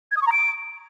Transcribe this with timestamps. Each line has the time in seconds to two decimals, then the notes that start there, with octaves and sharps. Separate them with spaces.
0.11 G#6
0.17 D#6
0.22 C#6
0.27 A#5
0.32 D7